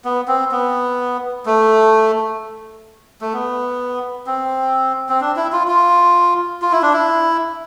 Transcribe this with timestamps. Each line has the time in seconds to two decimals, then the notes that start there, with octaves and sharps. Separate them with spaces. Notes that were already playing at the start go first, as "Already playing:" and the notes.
0.05 B3
0.28 C4
0.52 B3
1.46 A3
3.21 A3
3.33 B3
4.27 C4
5.09 C4
5.21 D4
5.36 E4
5.52 F4
5.68 F4
6.62 F4
6.72 E4
6.82 D4
6.93 E4